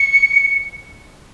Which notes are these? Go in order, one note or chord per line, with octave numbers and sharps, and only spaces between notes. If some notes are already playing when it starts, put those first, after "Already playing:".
Already playing: C#7